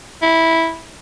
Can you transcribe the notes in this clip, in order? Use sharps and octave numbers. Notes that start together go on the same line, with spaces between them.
E4